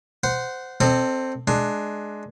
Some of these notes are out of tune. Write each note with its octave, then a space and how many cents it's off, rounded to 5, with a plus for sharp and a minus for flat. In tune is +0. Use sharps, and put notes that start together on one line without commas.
C5 -15 F#5 +0
C4 +5 A4 +15 D#5 -35
G#3 +20 D4 +15